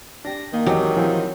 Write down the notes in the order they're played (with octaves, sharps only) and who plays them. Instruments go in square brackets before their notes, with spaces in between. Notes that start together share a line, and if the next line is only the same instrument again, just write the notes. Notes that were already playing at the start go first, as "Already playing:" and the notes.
[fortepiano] D4 G4 [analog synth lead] A#6
[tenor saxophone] D#3 [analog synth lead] A#3
[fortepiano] G#1 E2 D#5 [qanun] F#3 [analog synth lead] G4
[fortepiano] E3 C4 G4 [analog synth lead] F3